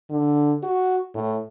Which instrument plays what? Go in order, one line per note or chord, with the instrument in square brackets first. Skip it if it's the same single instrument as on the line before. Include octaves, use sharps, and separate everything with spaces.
[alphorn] D3
F#4
A2